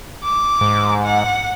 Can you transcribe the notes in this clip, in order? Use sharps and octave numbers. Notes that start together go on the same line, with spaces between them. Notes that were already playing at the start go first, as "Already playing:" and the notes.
D6
G#2
F#5